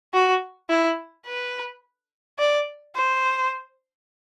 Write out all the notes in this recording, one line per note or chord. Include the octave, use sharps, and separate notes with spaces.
F#4
E4
B4
D5
C5